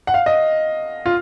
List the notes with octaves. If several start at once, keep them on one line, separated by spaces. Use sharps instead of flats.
F#5
F5
D#5
F4